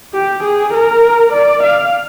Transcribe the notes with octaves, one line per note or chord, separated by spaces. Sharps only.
G4
G#4
A#4
D5
F5